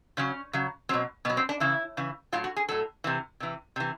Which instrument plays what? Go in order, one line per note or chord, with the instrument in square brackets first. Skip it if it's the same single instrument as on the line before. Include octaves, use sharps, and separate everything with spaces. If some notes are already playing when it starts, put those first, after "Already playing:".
[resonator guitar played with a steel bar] C#3 F#3 C#4
C#3 F#3
B2 F#3 C4
B2 B3
F#3
C4
D4
C#3 E3 E4
C#3 E3
A2 F#3 F4
F#4
G#4
A2 F#3 A4
C3 E3
C3 E3
C3 E3